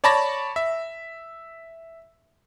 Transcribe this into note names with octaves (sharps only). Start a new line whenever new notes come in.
C#5 D5 A5 B5 C#6 A#6
E5